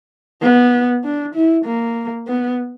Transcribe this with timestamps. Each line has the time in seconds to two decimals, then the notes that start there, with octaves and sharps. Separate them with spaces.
0.42 B3
1.04 D4
1.35 E4
1.65 A#3
2.27 B3